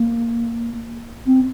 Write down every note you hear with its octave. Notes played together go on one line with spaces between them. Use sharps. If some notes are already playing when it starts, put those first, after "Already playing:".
Already playing: A#3
C4